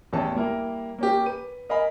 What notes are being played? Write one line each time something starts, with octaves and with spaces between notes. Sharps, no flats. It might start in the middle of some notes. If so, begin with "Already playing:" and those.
A1 E2 C#4 A5
G3 A#3 E4 A#4
A#3 C#4 G4
B4 D#7
A#4 D#5 F5 G#5 B5